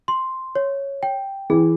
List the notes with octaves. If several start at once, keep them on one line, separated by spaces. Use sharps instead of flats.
C6
C#5
G5
E3 G#4